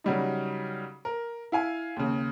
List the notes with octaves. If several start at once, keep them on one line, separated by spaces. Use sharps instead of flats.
C#3 F#3 G3 D#4
A#4
E4 F5 G#5
D#2 C#3